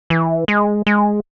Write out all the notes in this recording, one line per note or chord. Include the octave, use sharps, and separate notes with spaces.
E3
G#3
G#3